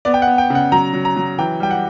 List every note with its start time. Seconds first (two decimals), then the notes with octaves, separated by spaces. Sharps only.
0.05 B3 D5
0.14 G5
0.22 F#5
0.27 B3
0.38 G5
0.50 C#3
0.55 F#5
0.72 F#3 A#5
0.93 F#3
1.05 A#5
1.16 F#3
1.38 E3 G5
1.60 G3 G5
1.71 F#5